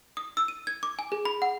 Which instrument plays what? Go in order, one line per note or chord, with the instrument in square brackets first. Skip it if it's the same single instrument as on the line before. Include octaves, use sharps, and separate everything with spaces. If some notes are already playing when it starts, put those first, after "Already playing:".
[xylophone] D#6
E6
D#7
G#6
D6
G#5
G#4
B5
F#5